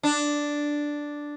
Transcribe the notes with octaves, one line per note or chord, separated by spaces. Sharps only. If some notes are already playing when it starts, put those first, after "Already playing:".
D4